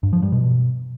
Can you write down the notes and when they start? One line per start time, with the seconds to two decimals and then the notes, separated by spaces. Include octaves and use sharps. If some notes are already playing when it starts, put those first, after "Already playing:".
0.03 G2
0.13 F3
0.22 G2
0.32 B2